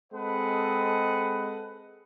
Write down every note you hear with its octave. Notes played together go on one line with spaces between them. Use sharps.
G#3 C4 A4 B4 D#5 F#5